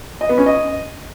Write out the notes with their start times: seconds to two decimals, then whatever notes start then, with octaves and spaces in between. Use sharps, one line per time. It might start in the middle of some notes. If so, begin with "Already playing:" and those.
0.21 D#5
0.29 B3
0.38 C#4
0.46 D#5